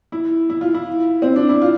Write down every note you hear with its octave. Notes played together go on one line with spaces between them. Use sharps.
E4
E4
F4
E4
C4
D4
E4
F4